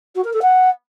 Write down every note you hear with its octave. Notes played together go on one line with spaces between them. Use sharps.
F#4
A#4
A4
F#5